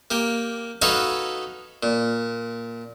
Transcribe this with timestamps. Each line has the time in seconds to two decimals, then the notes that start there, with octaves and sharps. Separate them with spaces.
0.11 A#3 G4
0.82 D#4 F#4 A4 B4 C#5 F5
1.83 A#2